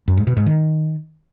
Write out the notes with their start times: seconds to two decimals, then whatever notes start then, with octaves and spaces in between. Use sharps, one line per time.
0.08 F#2
0.17 G#2
0.27 B2
0.37 G#2
0.46 D#3